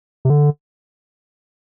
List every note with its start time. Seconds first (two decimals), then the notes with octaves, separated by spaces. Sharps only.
0.25 C3
0.30 D3